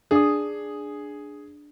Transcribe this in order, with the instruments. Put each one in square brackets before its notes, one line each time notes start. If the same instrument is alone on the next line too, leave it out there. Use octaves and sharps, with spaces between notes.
[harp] D4 D#6 [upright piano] G#4